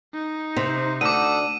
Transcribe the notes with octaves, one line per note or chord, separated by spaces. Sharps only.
D#4
C3 C5
D2 A4 F#5 D6 D#6 D#7